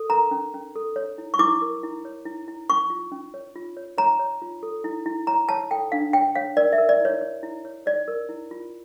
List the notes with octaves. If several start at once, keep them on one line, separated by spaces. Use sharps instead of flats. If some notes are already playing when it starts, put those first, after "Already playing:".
Already playing: A4
A#4 A#5
C#4
C#4
A4
C#5
E4
C#6
E4 D6
A#4
E4
C#5
E4
E4
C#4 C#6
F4
C#4
C#5
F4
C#5
C#5 A#5
C#5
F4
A4
E4
E4
C#5 A#5
C#5 A5
A4 G5
D4 F5
C#5 G5
C#5 F5
A#4 D5
E5
A#4
D5
E4 C#5
C#5
E4
C#5
C#5 D5
A#4
E4
F4